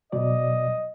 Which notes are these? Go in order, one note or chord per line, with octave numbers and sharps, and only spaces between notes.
B2 F#3 D5 D#5